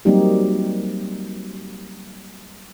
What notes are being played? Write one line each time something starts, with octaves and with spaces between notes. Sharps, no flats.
F#3 G3 A#3 C4 D#4 G4